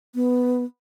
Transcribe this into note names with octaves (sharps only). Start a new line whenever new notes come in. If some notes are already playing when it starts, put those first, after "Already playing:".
B3